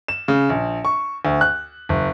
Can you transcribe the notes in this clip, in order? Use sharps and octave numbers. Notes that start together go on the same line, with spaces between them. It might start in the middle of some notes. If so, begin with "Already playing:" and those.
E7
C#3
A#1
C#6
D2
F#6
F#1